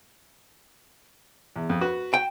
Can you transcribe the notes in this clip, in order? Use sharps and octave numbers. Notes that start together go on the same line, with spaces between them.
E2
F2
F#4 B4
G5